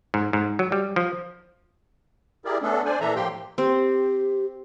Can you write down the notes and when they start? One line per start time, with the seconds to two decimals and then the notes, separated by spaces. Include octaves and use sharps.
0.14 G#2
0.33 G#2
0.59 F#3
0.72 G3
0.96 F3
2.45 E4 G4 G#4 A#4 D5
2.62 A3 B3 C#4 D4 A4
2.85 D4 C5 D5 G#5
3.00 A#2 E3 D4 A4 E5 A#5
3.16 A2 F3 A#3 G4 G5 C6
3.58 C4 G4